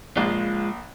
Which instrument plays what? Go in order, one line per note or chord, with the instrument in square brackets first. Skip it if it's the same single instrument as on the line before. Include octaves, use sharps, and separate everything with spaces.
[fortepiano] A#1 [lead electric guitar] G#3 F4